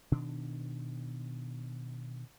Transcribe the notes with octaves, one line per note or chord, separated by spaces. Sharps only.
B2 D#3 D4